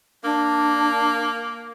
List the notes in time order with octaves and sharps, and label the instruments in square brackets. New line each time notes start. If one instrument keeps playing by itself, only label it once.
[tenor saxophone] A#3 [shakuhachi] D4